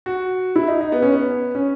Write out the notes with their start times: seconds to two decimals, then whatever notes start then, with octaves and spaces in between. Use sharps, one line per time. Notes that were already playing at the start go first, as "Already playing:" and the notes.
0.06 F#4
0.56 E4
0.68 D#4
0.81 D#4
0.92 B3
1.02 C#4
1.12 B3
1.55 C#4